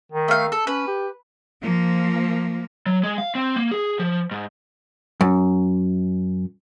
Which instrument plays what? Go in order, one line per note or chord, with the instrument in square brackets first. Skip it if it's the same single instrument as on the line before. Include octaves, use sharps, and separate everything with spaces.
[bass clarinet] D#3
[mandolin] A3 F5
A4
[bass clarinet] C#4 [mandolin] B4
[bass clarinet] G4
[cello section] F3 A#3
[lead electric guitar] F#3
G#3
F5
C4
A#3
G#4
F3
G#2
[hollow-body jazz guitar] F#2